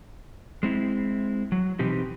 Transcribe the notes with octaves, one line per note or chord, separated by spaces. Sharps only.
G#3 C4 E4
F#3
B2 E3 C4 D#4 G4